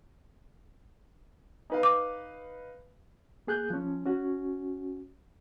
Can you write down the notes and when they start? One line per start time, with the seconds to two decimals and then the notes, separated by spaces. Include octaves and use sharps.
1.70 D#4 B4 F5
1.83 D6
3.47 A#3 G#4 F#6 G6
3.70 F3 C#4
4.06 C#4 F#4